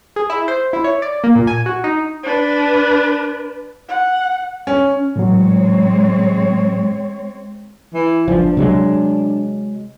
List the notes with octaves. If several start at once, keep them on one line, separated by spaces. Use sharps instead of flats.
G#4
E4
C5
E4
C#5
D5
A#3
A#2
G#5
F#4
D#4
D4 B4
F#5
C#4
A2 E3 F#3 G#3 C4 C#5
E3
G1 F3 D4
C3 F#3 G#3